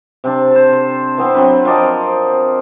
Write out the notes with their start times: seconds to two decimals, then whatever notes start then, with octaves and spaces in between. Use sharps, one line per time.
0.24 C3 C4 D4
0.51 A4 C5
0.73 C5
1.18 E3 B3 C4
1.35 F#3 C4 D4 B4
1.65 F3 A#4 D5 D#5